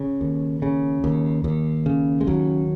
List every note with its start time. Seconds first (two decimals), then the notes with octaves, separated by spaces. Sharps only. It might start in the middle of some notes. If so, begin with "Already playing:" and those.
Already playing: C#3
0.21 D#2
0.62 C#3
1.04 D#2
1.44 D#2
1.86 C#3
2.21 G#3
2.27 D#2 F#3